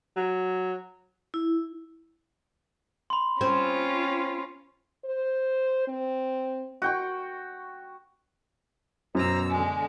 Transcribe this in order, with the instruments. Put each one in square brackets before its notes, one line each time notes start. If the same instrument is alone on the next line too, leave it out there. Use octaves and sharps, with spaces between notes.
[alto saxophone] F#3
[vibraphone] E4
[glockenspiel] B5 C6
[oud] C4 [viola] C#4 F4
[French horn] C5
C4
[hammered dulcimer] F#4 G5 C#6
[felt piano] F#2 [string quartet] B2 A#5 E6 [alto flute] C5
[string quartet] D3 G#3 [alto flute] G#5